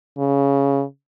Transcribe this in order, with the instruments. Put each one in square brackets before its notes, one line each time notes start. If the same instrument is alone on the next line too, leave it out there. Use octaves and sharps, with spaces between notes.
[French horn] C#3